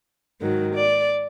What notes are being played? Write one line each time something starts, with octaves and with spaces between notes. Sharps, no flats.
G#2 D#3 F#3
D5